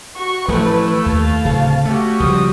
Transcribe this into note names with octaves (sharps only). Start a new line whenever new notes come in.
F#4 C#6
A1 E3 F3 A3 E4 B4
D#2 F5 A5
D1 C#3
A3 C#4 F#4 G4
C#2 F3 G3 D#6